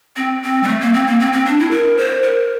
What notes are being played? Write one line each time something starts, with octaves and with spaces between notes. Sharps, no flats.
C4
C4
G3
A3
A#3
C4
A#3
C4
C4
D4
E4
A#4
C5
A#4